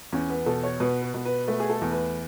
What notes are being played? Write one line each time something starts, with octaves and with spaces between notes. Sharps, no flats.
E2 C#4
B3
B2 A4
C#5
B2 B4
B4
B2
B4
A3 B4
G#4
A4
E2
B4